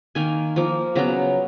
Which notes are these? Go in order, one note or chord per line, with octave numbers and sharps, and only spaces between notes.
D#3 A#3 G#5
F3 A#3
C#3 F#3 B3 A#5